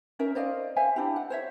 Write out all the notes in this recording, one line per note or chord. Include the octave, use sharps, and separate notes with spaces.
C#4 D#4 A#4 E5
C5 D5 D#5 F5
C5 E5 F5 G#5
D4 E4 G4
F#5
C5 C#5 E5